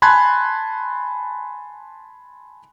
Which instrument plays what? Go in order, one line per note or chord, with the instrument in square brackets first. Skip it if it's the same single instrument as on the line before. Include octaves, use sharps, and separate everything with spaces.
[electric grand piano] G#5 A5 B5 C6 F#6 G#6